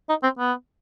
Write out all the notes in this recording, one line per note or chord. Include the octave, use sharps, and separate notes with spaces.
D#4
C4
B3